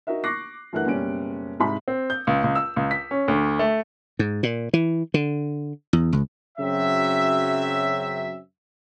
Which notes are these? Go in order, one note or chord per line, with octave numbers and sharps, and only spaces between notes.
D#4 F#4 A#4 E5
C#6 D6 F#6 A#6 C7
G2 E3 A3 A#4 F#5 F#6
F#1 B2 G3 C#4 D7
C2 G#2 B5
C4
G6
C#2
C#2
E6
C#2
B6
C#4
D2
A3
G#2
A#2
E3
D3
E2
C#2
F#2 C#3 F#3 C4 E5